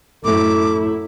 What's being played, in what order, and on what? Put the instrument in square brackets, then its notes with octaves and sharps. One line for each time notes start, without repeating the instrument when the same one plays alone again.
[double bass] F#2 E4 [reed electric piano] A2 A3 [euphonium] A4 [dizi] D6